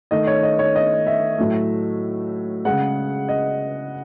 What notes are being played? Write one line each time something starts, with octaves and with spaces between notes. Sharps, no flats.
D#3 A3 D#5
C#5
D#5
C#5
D#5
E5
A2 F#3 A3
C#3 G#3 F#5
D#5